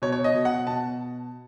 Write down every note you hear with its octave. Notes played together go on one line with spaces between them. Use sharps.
B2 C#5
C#5
D#5
B2
F#5
B2 A5